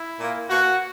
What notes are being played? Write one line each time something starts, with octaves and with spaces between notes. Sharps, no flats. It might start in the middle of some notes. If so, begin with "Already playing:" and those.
Already playing: E4
A#2 A#3
B2 A#3 F#4